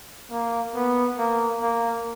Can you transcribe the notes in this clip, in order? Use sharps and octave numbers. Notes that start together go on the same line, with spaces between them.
A#3
B3
A#3
A#3